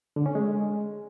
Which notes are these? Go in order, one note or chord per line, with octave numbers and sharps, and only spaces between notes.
D3
C#4
G#3